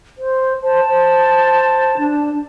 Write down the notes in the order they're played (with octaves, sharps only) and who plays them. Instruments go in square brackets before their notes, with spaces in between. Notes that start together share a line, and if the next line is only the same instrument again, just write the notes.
[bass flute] C5
[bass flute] C5 [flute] A5
[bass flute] C5
D4